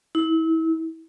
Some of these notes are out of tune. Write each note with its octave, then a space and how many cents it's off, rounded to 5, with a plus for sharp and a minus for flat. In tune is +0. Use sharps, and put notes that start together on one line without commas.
E4 -30